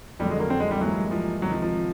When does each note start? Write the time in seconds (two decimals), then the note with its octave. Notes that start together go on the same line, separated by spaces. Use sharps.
0.19 F2 D3 F#3 G3
0.30 G#3
0.40 A#3
0.50 C4
0.60 G#3
0.71 G3
0.81 G#2 E3 F#3 G3 A#3
1.11 F3
1.42 C#2 C3 D#3 F#3
1.52 F3
1.62 F3